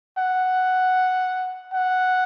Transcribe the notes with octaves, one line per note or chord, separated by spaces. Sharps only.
F#5
F#5